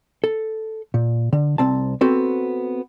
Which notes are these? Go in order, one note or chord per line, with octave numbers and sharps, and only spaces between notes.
A4
A#2
D3
C2 C4 A5
B3 C4 F#4 A4